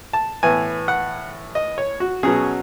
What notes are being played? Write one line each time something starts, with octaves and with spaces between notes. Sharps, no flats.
A5
A2 E3 B3 G#5
F#5
D#5
C#5
F#4
B2 F#3 C#4 G#4